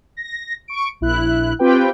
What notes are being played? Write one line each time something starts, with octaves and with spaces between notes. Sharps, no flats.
A#6
C#6 D7
A#1 E4 F#6
C4 F4 G4 B4 G5